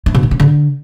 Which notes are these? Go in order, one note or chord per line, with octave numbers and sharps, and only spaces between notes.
E4
B2
D#3
C#4
D3